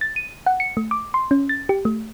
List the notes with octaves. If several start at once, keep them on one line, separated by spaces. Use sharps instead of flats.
A6
D#7
F#5
C#7
A3
D6
C6
C#4
A6
G4
A3